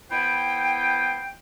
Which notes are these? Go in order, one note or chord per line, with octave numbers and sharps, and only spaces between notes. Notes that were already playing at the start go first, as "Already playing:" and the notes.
B3 E4 C5 G5